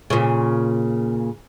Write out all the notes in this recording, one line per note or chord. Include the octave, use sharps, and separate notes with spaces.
A#2 C#3